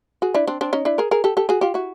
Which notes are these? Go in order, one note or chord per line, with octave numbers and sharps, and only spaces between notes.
F#4 G#4
D4 E4
C4 D4
C4 D4
C#4 D#4
D4 E4
G#4 A#4
G#4 A#4
G4 A4
G4 A4
F#4 G#4
F4 G4
E4 F#4